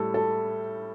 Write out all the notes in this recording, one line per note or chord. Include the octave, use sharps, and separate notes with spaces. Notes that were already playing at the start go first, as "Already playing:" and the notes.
Already playing: A2 G3 A4
A4